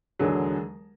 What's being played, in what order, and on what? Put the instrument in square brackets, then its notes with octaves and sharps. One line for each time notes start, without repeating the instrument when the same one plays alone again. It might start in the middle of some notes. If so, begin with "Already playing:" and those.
[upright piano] E1 D#2 D3 F#3 G#4